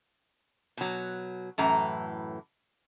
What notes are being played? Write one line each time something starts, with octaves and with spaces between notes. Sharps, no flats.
B2 F#3
F#2 A2 E3 A#5